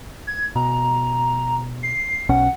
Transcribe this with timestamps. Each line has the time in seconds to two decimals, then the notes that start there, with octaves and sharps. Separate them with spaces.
0.27 G#6
0.56 B2 A#5
1.83 C7
2.29 B1 B2 C#4 F#5